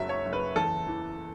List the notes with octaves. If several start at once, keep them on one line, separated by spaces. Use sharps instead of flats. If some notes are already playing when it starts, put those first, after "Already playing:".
Already playing: F#1 F#3 E5
C#5
F#1
B4
E2 A4
E3